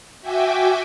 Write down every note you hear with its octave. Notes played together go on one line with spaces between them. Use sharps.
F#4 E5 G5 G#5 D6